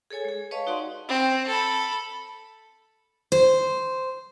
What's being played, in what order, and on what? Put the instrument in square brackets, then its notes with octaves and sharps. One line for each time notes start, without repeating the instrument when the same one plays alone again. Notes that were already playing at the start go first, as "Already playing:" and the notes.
[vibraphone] G#4 A4 C#5 G#5
G#3 G#4
B4 C#5 D#5 F5 A5 C#6
D#4 F#4 D5 F#5 C6
[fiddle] C4
A4 B5
[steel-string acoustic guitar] C5